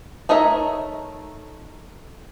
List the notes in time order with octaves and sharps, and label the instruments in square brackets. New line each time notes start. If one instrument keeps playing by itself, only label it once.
[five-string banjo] A3 D#4 A#4 C#5 E5